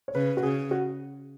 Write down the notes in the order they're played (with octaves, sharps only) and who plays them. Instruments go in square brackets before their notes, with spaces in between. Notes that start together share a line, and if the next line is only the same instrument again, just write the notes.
[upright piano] C#5
[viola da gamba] C#3 [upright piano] B4
[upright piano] F#4
[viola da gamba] C#3 [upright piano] G#4
[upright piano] F#4